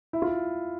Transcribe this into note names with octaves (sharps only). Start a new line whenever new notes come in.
E4
F4